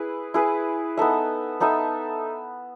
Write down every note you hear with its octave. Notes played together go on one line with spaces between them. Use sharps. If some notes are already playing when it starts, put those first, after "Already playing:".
Already playing: E4 G#4 B4
E4 G#4 B4
B3 D#4 A4 E5
B3 D#4 A4 E5